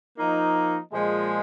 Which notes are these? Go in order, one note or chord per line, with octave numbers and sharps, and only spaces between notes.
F3 A#3 D#4
A#2 F3 G#3